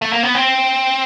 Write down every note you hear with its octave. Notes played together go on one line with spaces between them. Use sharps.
A3
A#3
B3
C4